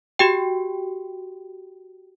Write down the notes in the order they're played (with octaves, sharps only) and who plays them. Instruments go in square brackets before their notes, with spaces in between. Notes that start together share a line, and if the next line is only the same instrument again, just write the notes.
[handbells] F#4 G4 G5